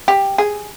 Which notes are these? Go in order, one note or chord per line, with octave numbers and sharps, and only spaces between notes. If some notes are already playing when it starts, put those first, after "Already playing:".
G4
G#4